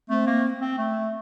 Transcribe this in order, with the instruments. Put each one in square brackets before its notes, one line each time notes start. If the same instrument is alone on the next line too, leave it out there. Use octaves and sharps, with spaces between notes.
[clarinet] A3 [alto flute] C4
[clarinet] A#3
C4
A3